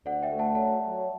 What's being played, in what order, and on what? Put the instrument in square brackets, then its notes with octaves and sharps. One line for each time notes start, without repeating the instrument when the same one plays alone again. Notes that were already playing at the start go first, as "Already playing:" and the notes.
[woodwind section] D2 [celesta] D5 F#5
[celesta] E5 G5
[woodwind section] A3
[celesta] F#5 A5
[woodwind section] F#3 [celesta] F#5 A5
[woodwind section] F#3